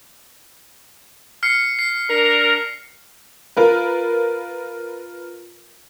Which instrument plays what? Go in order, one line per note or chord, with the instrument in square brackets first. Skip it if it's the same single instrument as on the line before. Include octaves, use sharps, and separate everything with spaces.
[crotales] F6 C7 C#7
C7
[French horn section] D4 A#4
[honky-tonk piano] F4 A#4 B4